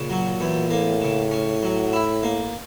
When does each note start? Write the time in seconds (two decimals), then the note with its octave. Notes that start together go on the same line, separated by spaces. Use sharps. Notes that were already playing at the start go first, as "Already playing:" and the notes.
Already playing: A#2 C#3
0.10 F#3
0.41 E2
0.70 A2 A#3
1.02 C#3
1.32 C#4
1.63 F#3
1.93 E4
2.23 A#3